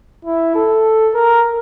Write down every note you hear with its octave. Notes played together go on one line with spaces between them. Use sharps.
E4
A4
A#4